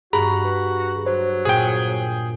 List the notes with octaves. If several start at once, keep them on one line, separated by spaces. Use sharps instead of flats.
G2 F#4 G#4 A#5 B5 C#6
B4
F#3 C5
A#2 G#4 G5